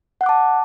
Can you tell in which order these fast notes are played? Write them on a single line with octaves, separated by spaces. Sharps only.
F#5 F#6 D6 A5